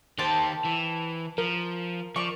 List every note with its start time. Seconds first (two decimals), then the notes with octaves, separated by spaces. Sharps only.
0.18 D#3 G4 C5 G5 A5
0.65 E3
1.38 F3 A#4
2.16 F3 D5 C#6